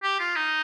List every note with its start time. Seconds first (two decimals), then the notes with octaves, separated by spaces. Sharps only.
0.03 G4
0.19 F4
0.36 D#4